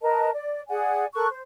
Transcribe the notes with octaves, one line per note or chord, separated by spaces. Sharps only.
A#4 B4 D#5 A5
D5
G#4 D5 F#5 G#5
A4 A#4 C#6 F#6
C5